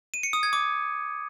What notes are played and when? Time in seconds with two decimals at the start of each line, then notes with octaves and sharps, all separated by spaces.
0.14 D#7
0.23 C#7
0.33 D#6
0.43 G#6
0.53 D6